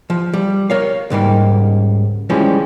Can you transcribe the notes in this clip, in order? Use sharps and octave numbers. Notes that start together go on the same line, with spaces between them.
F3
G3
A#4 C#5 F5
C#2 G#2 G3 A#3
E3 F3 G3 G#3 C#4